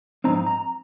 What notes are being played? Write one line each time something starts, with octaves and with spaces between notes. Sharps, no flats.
G#2 F3 C4 D#4 A#5
A#5